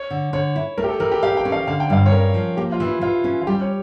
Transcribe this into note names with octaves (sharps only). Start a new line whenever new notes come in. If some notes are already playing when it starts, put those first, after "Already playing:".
Already playing: C#5
D3
D3 C#5
E4
A3 A#4
G4
A4
E3 A#4
G4
G4 F5
G5
C#4
F5
D3 F5
G5
G2 F5
C#5
C#4 A#4
F3
A#3 G4
F4
E3
E4
E3 F4
C#4
F4
G3 G4
C#5